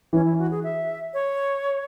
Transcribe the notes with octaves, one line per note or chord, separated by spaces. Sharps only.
E3 C#4
E4
F#4
G#4
E5
C#5